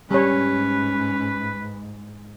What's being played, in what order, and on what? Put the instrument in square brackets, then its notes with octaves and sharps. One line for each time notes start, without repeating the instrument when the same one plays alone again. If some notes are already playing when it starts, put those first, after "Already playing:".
[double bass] G#2 [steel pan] G3 C#5 [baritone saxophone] C#4 [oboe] B4